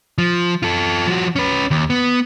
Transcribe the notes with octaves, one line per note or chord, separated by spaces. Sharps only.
F3
F4 A4
F3 F#4
C#4 B4
D#2
B3